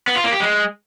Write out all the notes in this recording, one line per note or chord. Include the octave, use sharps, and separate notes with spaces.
B3
F4
A#3
G4
G#3